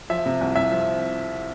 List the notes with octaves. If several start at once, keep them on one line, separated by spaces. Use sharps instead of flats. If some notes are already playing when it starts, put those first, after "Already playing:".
F3 E5
C3
C2
C2 E5
F3